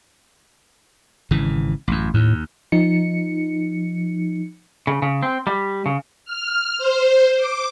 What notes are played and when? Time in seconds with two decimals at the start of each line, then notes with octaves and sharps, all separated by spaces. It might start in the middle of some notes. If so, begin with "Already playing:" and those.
1.31 G#1 C#3 E3
1.88 A1 F#2
2.14 D#2 A2
2.72 F3 D#4 C#7
4.87 C#3
5.02 C#3
5.23 C4
5.47 G3
5.86 C#3
6.25 F6
6.78 C5
7.37 D6